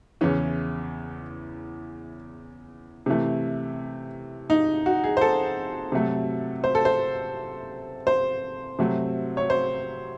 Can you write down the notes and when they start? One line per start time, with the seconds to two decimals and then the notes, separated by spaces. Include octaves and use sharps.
0.21 E2 C#3 E3 C#4
3.06 C3 E3 A3
4.50 D#4
4.86 F#4
5.04 G#4
5.17 C5
5.21 A4
5.92 C3 F#3 A3
6.64 C5
6.75 A4
6.85 C5
8.07 C5
8.79 C3 F#3 A3
9.37 C#5
9.50 C5